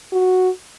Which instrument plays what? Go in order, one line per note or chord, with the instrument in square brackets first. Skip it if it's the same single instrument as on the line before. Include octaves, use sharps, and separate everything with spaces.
[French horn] F#4